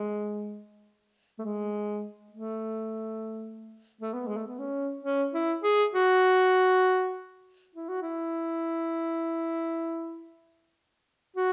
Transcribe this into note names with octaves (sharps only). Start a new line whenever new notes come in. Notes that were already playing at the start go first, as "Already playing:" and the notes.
Already playing: G#3
A3
G#3
A3
A3
B3
G#3
A3
B3
C#4
C#4
E4
G#4
F#4
E4
F#4
E4
F#4